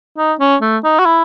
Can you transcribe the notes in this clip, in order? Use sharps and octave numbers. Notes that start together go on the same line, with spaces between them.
D#4
C#4
A3
D#4
F#4
E4